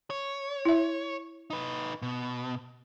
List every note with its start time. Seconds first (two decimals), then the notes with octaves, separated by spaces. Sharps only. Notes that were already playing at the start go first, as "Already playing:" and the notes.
0.10 C#5
0.65 E4 E5
1.50 D#4 B4
2.02 B2